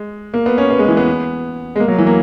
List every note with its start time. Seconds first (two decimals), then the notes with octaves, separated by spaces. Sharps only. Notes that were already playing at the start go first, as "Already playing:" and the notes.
Already playing: G#3
0.34 A#3
0.46 B3
0.58 C#4
0.71 B3
0.79 G#3
0.88 E3
0.97 B3
1.76 G#3
1.80 A#3
1.88 F#3
1.98 E3
2.07 A#3